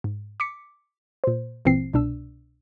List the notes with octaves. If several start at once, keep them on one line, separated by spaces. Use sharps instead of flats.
G#2
D6 B6 C#7
A#2 C5
G1 A#2 E3 C4 C7
C2 B2 D4 E6